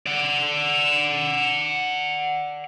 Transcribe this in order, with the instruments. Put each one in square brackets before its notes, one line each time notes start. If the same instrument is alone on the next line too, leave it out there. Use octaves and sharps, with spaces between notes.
[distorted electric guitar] D5 F#5